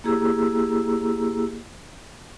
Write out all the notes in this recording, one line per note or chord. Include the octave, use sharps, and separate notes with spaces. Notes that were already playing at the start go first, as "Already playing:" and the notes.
A#3 E4 G4 G#4 A#5 E6